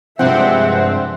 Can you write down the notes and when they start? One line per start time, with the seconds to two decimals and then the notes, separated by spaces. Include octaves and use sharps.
0.19 G2 C3 F3 G#3 C4 E5 F#5